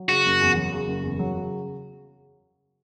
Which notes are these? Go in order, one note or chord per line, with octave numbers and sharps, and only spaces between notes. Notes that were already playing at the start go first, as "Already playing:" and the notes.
Already playing: F#3
C#3 F#4
F#1
E2
F#3
C#3
F#1
E2
F#3
C#3